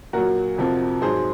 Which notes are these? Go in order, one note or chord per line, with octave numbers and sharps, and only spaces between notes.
A#2 F#3 F#4 A#4
F2 C3 F3
G#2 F#3 G#4 C5